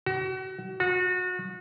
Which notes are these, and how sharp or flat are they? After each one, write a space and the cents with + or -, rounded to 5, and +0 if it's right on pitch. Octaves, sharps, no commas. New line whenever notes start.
F#4 +35
F#4 -30